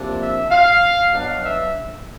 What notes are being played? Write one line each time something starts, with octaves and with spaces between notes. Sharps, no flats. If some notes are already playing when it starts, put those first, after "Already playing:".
Already playing: C3 F3 A#3 D4
E5
F5
B2 F#3 B3 D4 F5
E5